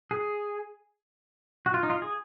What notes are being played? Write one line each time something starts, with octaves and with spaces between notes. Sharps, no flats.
G#4
F#4
F4
D#4
F4
G#4